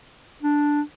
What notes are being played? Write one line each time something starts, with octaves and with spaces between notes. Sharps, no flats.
D4